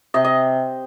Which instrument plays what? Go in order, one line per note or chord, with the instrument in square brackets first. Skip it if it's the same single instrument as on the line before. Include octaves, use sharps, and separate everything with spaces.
[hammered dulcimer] C3 D#5
D#5